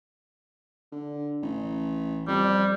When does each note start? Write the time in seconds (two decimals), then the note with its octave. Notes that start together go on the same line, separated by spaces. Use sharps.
0.92 D3
1.42 A1
2.28 F2 G3